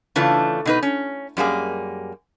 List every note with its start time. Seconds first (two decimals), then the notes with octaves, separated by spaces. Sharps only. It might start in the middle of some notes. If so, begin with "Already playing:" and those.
0.16 C#3 E3 A3 D4 F4
0.66 B2 D#4 B4
0.83 C#4
1.37 F#2 G3 A#3 G#4